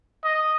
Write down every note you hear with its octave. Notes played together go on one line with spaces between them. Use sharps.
D#5